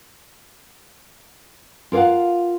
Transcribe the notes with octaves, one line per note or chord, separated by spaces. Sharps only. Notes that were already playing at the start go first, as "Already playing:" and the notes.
F4 A#4 C#5 F5 F#5